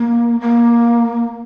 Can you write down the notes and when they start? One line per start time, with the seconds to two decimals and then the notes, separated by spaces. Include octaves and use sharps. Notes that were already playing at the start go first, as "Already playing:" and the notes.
Already playing: A#3
0.40 A#3